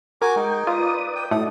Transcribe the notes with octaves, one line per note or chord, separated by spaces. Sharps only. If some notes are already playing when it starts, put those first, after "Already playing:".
F#4 A#4 G#5 D6
G#3 D#4 G5
F4 B4 D5 D#6
G5
A2 A3 D#4 F#4 D5 D#6